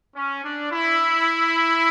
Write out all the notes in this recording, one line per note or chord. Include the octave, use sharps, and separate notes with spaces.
C#4
D4
E4